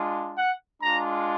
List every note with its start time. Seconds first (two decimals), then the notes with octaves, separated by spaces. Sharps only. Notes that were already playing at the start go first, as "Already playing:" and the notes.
Already playing: G#3 D4 F4
0.36 F#5
0.82 G#3 D4 F4 A#5